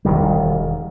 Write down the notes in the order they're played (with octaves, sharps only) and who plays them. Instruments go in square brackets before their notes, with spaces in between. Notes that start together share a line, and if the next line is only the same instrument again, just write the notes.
[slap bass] E1 D#3 G3